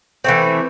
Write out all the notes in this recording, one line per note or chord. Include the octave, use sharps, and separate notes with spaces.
E3 A3 C4